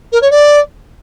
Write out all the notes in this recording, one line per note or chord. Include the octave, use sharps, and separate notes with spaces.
A#4
C#5
D5